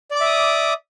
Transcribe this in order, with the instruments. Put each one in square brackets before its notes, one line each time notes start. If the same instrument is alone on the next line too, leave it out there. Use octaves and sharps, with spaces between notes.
[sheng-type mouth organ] D5
D6
E5
D#6